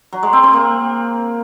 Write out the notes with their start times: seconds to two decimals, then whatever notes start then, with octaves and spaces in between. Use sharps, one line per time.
0.13 F#3
0.23 G#3
0.33 C4
0.43 C4
0.53 A#3